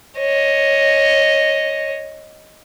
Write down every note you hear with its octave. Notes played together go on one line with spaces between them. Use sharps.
C#5 D#5